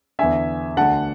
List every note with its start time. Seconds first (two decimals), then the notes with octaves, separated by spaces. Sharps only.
0.19 E2 D3 E5 G#5
0.77 D2 D3 F#5 A5